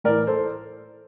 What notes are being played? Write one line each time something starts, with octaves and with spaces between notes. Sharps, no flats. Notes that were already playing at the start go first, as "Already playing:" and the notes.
A2 E3 A#4 D5
A4 C5